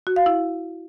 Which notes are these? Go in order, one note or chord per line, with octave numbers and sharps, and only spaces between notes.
F#4
F5
E4